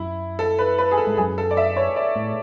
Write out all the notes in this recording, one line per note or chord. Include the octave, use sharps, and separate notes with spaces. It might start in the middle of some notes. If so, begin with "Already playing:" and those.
Already playing: F#2 E4
A4
B4
B4
G#4
A4
G#2
F#2 G#4
A4
D5
E5
C#5
D5
A2